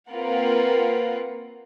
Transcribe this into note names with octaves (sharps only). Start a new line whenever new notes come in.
A#3 C4 F4 A#4 B4 F#5